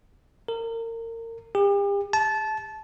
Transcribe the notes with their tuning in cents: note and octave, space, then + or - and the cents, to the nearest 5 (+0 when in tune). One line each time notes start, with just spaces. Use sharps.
A#4 -30
G4 +40
A5 -20